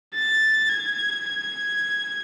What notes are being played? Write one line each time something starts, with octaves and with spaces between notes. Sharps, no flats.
A6
G#6